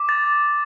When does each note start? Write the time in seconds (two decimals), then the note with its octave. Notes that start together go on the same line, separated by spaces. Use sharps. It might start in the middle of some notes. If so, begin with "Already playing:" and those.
Already playing: D6
0.09 A6